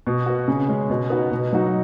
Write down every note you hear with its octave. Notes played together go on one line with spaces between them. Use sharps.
B2
B3 F#4
C#3
G#3 C#4
B2
B3 D#4 F#4
B2
F#3 D#4 F#4